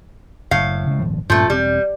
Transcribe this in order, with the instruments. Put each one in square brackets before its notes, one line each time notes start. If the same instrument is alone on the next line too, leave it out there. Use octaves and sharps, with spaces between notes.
[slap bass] F#1 [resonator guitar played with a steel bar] A2 F5
[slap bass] C#3 G#3
D#1 G#1 F3
[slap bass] G2 A#2 C#4 [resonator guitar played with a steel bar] F3 A3
[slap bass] E1 B2 C4 [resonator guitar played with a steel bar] G3